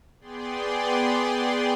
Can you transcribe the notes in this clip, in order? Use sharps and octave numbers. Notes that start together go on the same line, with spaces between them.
B3 G#4 D5 G5 C6